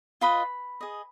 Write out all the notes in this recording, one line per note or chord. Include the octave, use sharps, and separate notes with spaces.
F4 B4 D#5 B5
G#4 D#5